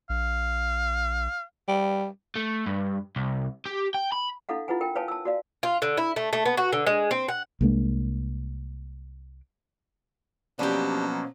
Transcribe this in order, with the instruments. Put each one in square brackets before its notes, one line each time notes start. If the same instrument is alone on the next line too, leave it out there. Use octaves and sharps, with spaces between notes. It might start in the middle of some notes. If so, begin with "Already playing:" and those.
[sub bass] A#1 [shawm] F5
[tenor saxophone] G3
[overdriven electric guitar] A3
G2
C2
G4
G5
B5
[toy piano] D4 E4 A4 F5 F#5
E4 F4 B4 F#5 G#5
A#4 G5
B4 C#5 F5 G#5 A5
A5 E6
F#4 D5 F5
[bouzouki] F4
D3
E4
A3
A3
B3
F#4
D3
G#3
C4
F#5
[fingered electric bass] C2 G#3 A#3 D4
[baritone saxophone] B2 [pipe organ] F3 F#3 A#3 [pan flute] C#4 [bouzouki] D4 G4